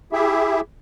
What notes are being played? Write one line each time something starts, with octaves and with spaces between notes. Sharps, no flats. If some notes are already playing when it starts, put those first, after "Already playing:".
E4 G4 G#4 E5